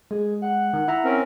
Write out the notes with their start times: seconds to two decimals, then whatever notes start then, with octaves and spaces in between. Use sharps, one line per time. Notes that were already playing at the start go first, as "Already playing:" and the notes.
0.11 G#3 G#4
0.42 F#5
0.73 D#3
0.88 E4 E5 A#5
1.04 C4 C#4 A#4